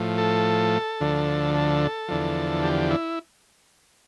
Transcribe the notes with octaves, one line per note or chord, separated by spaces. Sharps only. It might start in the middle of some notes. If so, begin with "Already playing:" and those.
Already playing: A2 F3
A4
D2 D3 F3
A4
E2 D3 F3
G4
E4